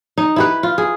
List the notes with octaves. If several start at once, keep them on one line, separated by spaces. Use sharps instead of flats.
D#4
E4 G4 B4
F4
G#4